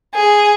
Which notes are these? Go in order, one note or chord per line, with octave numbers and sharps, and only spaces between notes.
G#4